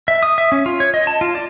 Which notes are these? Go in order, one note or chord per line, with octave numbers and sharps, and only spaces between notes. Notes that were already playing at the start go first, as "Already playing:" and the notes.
E5
D#6
E5
C#4
F4
C#5
D#5
A5
F4
D5